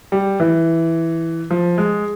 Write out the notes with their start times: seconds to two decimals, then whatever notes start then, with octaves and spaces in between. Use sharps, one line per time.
0.12 G3
0.40 E3
1.51 F3
1.78 G#3